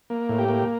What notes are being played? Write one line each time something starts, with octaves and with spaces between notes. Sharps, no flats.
A#3
A2
G4
A#3